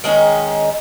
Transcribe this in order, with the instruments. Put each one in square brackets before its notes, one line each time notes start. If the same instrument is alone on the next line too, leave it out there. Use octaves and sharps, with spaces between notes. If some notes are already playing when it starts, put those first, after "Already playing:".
[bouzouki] D#3 G#3 C#4